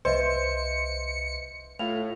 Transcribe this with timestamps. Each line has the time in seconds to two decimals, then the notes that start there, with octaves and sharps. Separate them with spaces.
0.05 C2 B4 C5 D#5 E5 C#7
1.79 A2 F4 A4 F5 F7